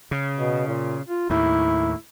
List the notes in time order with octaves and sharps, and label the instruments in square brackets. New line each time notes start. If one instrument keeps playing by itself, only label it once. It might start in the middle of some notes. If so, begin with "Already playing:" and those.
[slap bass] C#3
[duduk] B2
A#2
F4
[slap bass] D#2 A2 [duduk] E4